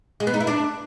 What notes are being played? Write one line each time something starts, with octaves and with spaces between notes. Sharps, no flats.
G#3
B3
D#4
E4
D4